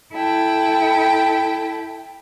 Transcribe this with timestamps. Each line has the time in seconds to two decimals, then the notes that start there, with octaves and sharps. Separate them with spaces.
0.14 E4 A4 G5 A5